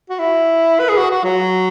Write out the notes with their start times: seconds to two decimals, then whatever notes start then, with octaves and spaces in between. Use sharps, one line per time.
0.10 F#4
0.19 E4
0.80 B4
0.89 G#4
0.98 F#4
1.11 F#4
1.24 F#3